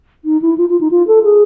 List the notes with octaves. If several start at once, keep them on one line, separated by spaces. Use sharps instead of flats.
D#4
E4
F4
F4
D#4
F4
A4
G#4